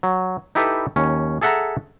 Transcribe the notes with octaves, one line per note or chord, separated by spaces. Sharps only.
F#3
D#4 E4 G4 A4 B4
D#2 C#4
G#4 A4 E5 F#5 A5 A#5